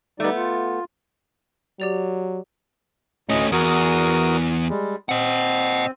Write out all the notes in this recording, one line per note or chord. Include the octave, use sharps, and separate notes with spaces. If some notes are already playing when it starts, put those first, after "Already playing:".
G3 A3 B3 D#4 D5
F4
F#3 G4 D5 F7
D2 A2 A3 C#4 D#5
E2 F#4 A#4 D#6
G3 G#3
C4 D#5 F#5